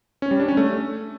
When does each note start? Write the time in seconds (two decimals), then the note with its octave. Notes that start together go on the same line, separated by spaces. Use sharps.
0.22 C#4
0.31 G3
0.40 D4
0.48 C#4
0.57 A3